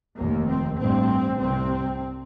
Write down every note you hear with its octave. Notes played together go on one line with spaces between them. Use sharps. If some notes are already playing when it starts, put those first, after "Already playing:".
F1 D#2 A#3
C4
A1 G2 C4
C2 C3 C4